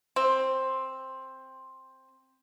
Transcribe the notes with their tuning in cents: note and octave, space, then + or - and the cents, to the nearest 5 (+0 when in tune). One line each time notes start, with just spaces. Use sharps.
C4 +10